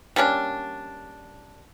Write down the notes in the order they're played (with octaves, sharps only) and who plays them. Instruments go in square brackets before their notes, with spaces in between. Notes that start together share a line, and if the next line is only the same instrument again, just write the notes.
[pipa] G3 A#3 C#4 D4